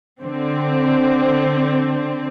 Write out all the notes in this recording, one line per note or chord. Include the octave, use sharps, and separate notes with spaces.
D3 C4